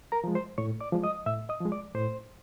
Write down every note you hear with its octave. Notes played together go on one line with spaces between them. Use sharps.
A#4 A#5
F3 G#3
C5 C6
A2 C#5 C#6
D5 D6
F3 G#3
D#5 D#6
A2 E5 E6
D#5 D#6
F3 G#3
D5 D6
A2 C5 C6